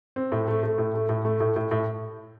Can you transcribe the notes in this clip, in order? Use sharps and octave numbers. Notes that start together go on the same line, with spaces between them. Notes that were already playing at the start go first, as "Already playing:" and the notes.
C4
A2
A3
A3
A2
A3
A2
A3
A2
A2
A2